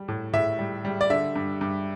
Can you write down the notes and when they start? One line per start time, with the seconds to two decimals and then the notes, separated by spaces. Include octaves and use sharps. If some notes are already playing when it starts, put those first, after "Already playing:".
Already playing: G3
0.08 A2
0.33 A2 E5
0.59 G3
0.85 G3
1.01 D5
1.10 D3 E5
1.36 G2
1.61 G2